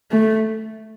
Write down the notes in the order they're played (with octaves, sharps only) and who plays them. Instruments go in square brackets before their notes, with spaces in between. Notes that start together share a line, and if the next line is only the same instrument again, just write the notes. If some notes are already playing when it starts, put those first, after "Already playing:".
[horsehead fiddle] A3